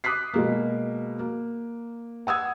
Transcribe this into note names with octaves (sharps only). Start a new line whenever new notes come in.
D6 D#6 F#6 B6 C7
B2 G#3 A#3
A#3
F#5 D#6 E6 G#6